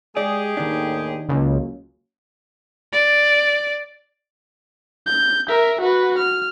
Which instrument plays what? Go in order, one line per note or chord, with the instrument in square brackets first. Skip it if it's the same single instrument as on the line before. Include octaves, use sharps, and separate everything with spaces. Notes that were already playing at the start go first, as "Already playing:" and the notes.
[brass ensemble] G#3 [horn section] G4 G#4 [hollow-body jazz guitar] D5
[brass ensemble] D#2 A2 [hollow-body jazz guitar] D#3 D4
[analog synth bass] C#2 [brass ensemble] F#3 A#3 C#4
[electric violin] D5
G6
A#4 E5
F#4 B4
F6